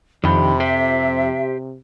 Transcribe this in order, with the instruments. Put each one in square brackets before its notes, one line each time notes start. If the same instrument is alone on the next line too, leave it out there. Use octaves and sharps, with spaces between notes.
[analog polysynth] F2 [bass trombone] C3 [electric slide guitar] D#3 D4 G4 [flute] B5
[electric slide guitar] G4 C5 [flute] E5